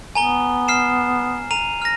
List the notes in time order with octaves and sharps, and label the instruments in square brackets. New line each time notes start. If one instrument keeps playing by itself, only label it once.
[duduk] B3 [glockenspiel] G#5 A#5 G7
[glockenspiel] F6 C7 E7
A#5 D#7 F7
F6 A#6